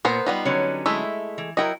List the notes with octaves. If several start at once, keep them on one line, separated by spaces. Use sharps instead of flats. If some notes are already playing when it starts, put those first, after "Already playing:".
A#2 B3 A#4 C5
G3 B3 D#4 F4
D3 F#3 C#4
G#3 A3 E4
E3
F#3 E4 A#4 D#5 G5